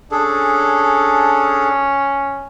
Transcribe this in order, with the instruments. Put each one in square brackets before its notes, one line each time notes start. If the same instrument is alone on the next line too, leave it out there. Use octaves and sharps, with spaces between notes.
[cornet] C#4 [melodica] D4 G#4 A4